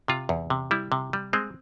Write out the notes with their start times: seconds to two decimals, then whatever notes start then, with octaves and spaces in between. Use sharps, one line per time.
0.08 C3 F4
0.29 E2
0.50 C3
0.71 G3 E4
0.92 C3
1.13 G3
1.33 G#3 C4